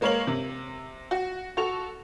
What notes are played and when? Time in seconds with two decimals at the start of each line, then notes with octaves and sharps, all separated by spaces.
0.01 G#3 A#3 A#4 C#5 F5 F#7
0.27 C3
1.11 F#4
1.57 F#4 A4 C#6 F7